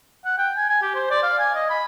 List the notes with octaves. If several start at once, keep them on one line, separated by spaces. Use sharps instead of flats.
F#5
G5
G#5
G#5
G4
C5
D5
F5
G#5
D#5
B5